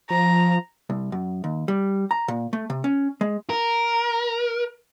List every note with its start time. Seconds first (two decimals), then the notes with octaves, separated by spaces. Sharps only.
0.10 F3 A#5
0.90 C2
1.12 F#2
1.44 D#2
1.68 G3
2.11 A#5
2.28 A#2
2.53 A3
2.70 C3
2.84 C#4
3.21 G#3
3.50 A#4